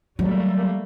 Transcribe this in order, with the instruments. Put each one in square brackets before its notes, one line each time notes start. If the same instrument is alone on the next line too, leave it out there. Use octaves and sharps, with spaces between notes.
[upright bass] F#3 [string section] G3 A3 A#3